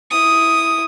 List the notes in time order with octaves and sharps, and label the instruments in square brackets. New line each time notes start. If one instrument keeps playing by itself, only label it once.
[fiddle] E4 D#6